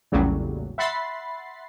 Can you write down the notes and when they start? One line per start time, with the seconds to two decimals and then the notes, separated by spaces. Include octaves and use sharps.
0.12 A#1 E2 A2 C#3 F#3 G3
0.78 E5 F#5 B5 C6 A6 C7